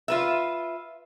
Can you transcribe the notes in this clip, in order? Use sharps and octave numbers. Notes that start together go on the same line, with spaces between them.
F4 B4 E5